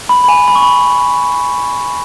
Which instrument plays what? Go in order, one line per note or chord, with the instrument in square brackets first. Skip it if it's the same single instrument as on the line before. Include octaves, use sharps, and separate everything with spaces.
[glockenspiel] B5
B5
G#5
B5
C#6
B5